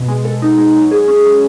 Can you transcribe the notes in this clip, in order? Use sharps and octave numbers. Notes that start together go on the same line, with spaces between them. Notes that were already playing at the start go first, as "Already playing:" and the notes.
Already playing: B2
G#3
A4
D#4
G#3
F#3
G#4
C#4
F#3